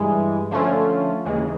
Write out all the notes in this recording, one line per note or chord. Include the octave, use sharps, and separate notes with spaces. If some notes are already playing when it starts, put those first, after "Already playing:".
Already playing: G2 E3 G#3
D3 F3 A3 C#4 F4
D#2 C#3 E3 G#3